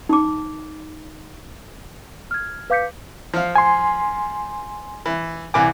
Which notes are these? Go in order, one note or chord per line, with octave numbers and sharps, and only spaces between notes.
D#4 D6
F6 G#6
B4 F5 D6 G6 B6 C#7
F3 F5
G#5 C6
E3
C2 E3 G#5 D6